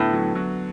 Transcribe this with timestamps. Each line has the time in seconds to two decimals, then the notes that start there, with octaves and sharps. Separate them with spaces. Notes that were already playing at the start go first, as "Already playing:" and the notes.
Already playing: A2 D3 B3
0.13 F#3
0.35 F#3